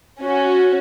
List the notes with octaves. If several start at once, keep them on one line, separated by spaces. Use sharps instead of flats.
C#4 F#4